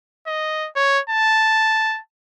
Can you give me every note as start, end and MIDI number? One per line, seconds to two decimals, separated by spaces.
0.27 0.69 75
0.76 1.00 73
1.10 2.00 81